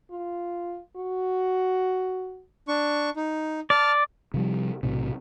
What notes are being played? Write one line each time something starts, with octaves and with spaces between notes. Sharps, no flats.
F4
F#4
D4 C#6
D#4
D5 A5 F6
C3 F3 G3
B1 A2 C3